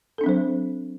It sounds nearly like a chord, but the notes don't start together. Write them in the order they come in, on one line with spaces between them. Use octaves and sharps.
A4 D4 C4 F#3 C5